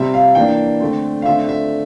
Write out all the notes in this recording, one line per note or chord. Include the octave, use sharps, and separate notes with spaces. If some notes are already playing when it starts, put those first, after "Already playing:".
Already playing: C3 G3 C4 E5
F5
E3 A#3 D4 G5
D3 A3 C4
F5
D3 A3 C4 E5
E5